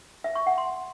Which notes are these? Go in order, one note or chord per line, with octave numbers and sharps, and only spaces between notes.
E5
C#6
F#5
C6